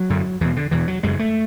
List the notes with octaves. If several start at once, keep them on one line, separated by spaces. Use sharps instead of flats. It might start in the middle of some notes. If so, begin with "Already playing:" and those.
Already playing: F#3
F#2 D3
E2 B2 E3
D3
E2 B2 E3
F#3
F#2 C#3 G#3
A3